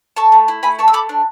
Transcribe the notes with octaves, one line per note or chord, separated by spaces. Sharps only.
A4 A5 C#6
A3
E4
A3 G#5 B5
A4 A5 C#6
E6
A3 B5 D6
D4